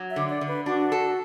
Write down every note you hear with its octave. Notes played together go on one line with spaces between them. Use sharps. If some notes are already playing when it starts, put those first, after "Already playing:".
Already playing: F#3
E5
D3
D5
D3
B4
D4 F#4
A4